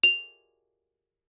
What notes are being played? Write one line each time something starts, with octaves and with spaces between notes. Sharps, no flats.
F7